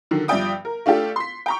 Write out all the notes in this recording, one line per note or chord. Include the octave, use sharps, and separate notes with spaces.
D3 D#3 F#3
G2 F3 D5 E5 G5 D#6
A#4
A3 D4 F4 G4 A4
C6 B6
G5 A#5 C#6